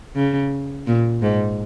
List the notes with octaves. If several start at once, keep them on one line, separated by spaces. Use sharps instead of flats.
C#3
A#2
G#2